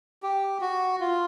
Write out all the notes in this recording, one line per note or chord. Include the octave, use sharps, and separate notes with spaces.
G4
F#4
F4